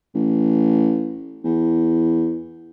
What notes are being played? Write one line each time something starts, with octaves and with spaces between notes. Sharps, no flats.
A1
E2